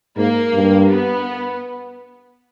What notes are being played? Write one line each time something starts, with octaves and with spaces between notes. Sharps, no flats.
G#2 A#3
G2
B3